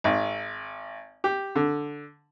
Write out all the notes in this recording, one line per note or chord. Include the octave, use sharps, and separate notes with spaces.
G#1
G4
D3